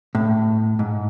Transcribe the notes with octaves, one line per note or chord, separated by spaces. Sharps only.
A2
G#2